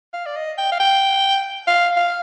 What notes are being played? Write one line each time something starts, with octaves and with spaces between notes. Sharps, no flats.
F5
D5
D#5
G5
F5
G5
F5
F5